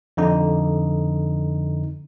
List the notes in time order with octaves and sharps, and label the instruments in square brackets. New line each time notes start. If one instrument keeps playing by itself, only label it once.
[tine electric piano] F2 D3 D#4